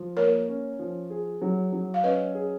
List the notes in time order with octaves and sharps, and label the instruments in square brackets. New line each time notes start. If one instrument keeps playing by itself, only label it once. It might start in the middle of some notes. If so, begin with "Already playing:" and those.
Already playing: [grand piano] F3
[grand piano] A#3 [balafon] A#4 C#5
[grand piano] C#4
F3
G#4
F#3
F#3
[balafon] F5
[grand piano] C#4 [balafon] B4 D#5
[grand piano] G#4